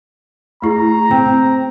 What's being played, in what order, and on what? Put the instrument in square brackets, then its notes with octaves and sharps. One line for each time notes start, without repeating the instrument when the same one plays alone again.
[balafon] A3 E4 G#4 [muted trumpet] A#5
[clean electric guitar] C4 [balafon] G5